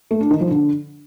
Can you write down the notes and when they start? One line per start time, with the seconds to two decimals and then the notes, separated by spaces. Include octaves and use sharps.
0.11 A3
0.21 D4
0.31 D#3
0.41 F3
0.51 D3